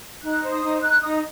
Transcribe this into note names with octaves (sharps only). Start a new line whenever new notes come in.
D#4 F#6
C5
D#6
D#4
D#4 F#6
D#4 D#6